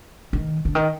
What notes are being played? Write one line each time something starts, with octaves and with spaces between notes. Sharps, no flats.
D#3
D3
D#3